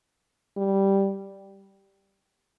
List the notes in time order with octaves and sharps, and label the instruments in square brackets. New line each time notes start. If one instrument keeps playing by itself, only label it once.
[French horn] G3